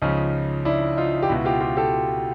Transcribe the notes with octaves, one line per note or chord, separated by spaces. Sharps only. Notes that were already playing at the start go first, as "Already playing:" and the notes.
C#2 C#3 F3 C#4 D#4
D4 E4
D#4 F4
G4
C#2 B2 E4 F#4
F4 G4
F4 G4
G4 A4